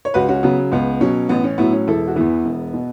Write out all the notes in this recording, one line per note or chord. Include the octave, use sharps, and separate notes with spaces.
C#5
C#2 F#4 B4
C#4 F#4
C#3 F#3 B3
C#2 B3
B2 F#3 C#4
A1 B3
C#4
A2 F#3 B3 E4
C#4
E1 E4 A4
F#4
E2 E3 B3 E4
E1
B2